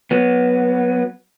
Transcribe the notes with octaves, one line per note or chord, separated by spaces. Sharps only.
F#3 B3